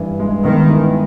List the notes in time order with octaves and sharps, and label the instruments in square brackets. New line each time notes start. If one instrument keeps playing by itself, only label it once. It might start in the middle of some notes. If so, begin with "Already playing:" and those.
Already playing: [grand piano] G2 E3
G#3
[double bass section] D#3 [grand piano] B3
[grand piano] E3